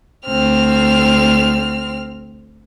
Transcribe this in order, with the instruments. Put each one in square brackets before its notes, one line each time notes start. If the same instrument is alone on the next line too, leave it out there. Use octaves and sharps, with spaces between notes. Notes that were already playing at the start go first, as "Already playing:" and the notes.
[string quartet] D2 C4 F6